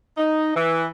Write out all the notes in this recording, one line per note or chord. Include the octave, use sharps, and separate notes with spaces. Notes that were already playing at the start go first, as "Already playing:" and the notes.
D#4
E3